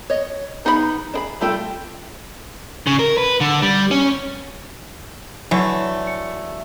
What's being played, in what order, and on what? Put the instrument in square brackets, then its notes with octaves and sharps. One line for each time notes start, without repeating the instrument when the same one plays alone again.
[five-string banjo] C#5 D#5
B3 D#4 G#4 D5 B5
D4 G#4 B5
G3 A3 F4 G4 A4
[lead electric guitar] C#3
A#4
B4
D3
G3
C#4
[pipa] D3 E3 A3 [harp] F#3
[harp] C#7